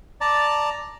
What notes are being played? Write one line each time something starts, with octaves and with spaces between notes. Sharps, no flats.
D5 A5 A#5